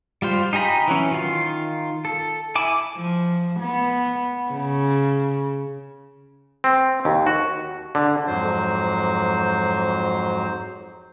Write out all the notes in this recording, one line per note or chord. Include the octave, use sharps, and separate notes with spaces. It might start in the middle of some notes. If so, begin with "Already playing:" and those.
G3 F4 C5
D#4 G4 G#5 A#5 B5
E3 F#3 C#4
D#3 F4
A4
E4 G#5 D6
F3
B3
C#3
C4
D#2
F#4
D3
F2 G#2 F#3 C5